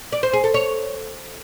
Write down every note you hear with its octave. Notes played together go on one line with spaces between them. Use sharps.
D5
C5
G#4
A4
C#5